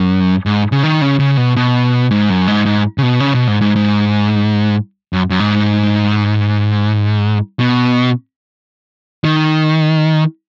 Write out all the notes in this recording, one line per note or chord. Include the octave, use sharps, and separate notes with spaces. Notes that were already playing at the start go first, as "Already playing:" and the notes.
Already playing: F#2
G#2
C#3
D#3
C#3
C#3
B2
B2
G#2
F#2
G#2
G#2
C#3
B2
C#3
B2
G#2
G#2
G#2
F#2
F#2
G#2
B2
D#3